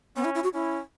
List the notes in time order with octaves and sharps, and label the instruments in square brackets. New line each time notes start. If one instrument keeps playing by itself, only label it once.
[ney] B3 [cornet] C#4
[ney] E4
E4
F#4
[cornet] C#4 [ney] E4